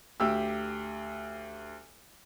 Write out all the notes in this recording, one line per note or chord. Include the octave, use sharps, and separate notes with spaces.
D2 G4 E6